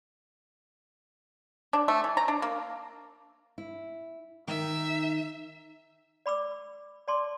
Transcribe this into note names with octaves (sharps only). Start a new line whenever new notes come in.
D4
A3
E3
A#5
D4
A#3
E4
D#3 D#4 E5 G5
D5 B5 D6 E6
D5 A5 C6 D6